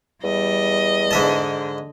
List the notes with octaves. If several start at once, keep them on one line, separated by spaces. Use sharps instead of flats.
E2 G3 D#5
G#2 D3 E5 A5